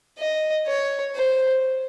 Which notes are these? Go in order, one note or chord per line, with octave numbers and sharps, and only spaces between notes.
D#5
C#5
C5